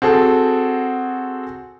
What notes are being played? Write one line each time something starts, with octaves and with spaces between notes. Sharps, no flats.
C4 F#4 G#4 A4